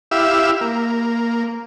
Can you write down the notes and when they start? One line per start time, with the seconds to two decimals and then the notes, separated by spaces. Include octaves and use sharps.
0.11 E4 G4 E5 F5
0.61 A#3